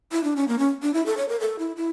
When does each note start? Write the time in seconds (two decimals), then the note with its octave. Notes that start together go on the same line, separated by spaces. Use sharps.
0.12 E4
0.24 D4
0.36 C#4
0.48 A#3
0.59 C#4
0.83 D4
0.94 E4
1.06 A4
1.17 C#5
1.29 A#4
1.40 A4
1.59 E4
1.77 E4